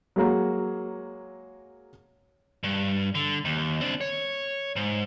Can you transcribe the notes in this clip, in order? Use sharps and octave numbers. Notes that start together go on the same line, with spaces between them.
F#3 G#3 A#3 F#4
G2
D3
D#2
C4 D4
C#5
G#2